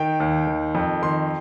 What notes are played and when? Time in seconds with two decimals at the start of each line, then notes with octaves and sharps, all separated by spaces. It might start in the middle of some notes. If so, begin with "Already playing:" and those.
Already playing: D#3 G5
0.20 D#2
0.47 D#3
0.75 F2
1.02 D#3 C6